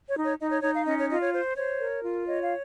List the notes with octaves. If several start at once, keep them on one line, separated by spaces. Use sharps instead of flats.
C#5
D#4
C#5
D#4 D#5
C#5
D#4 C#5
F5
C#4 D#5
C#5
F4 D#5
C#5
C5
C5 C#5
A#4
F4
C#5 D#5
F5